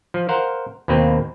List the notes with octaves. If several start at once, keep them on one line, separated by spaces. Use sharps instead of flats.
F3
A#4 C5 F5 F#5
D#2 B2 A#3 C4 B4